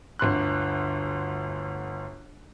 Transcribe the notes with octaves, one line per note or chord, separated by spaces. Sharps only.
G1 D2 C6 F#6